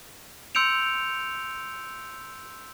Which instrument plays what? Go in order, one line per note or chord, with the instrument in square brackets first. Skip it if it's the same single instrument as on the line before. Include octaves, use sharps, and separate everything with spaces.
[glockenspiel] C6 E6 G6 C#7 D7 F7